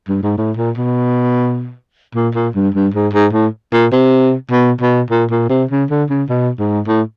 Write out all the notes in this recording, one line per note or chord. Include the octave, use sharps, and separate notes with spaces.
G2
G#2
A2
A#2
B2
A#2
A#2
G2
G2
G#2
G#2
A2
A#2
C3
B2
B2
A#2
A#2
C3
C#3
D3
C#3
B2
G#2
A2